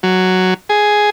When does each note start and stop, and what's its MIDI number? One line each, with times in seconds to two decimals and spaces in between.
0.03 0.54 54
0.69 1.10 68